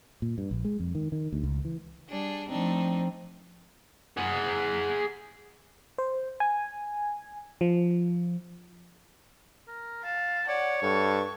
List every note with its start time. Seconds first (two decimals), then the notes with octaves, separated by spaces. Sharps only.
0.22 A#2
0.38 G2
0.51 A#1
0.65 G#3
0.80 F2
0.95 D#3
1.12 D#3
1.33 D2
1.44 C#2
1.65 E3
2.09 G3 D4 G#4
2.49 F3 A3 C4 D4 D#4
4.17 G#4 F#5
5.98 C5
6.40 G#5
7.61 F3
9.68 A#4
10.04 F5 A5
10.48 C#5 D5 F#5
10.83 G2 A4 C#6